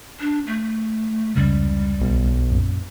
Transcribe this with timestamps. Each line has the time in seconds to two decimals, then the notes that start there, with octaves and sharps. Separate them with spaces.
0.20 D4
0.47 A3
1.35 F1 C#2 C#3 G3
2.01 B1
2.51 F#2 A#2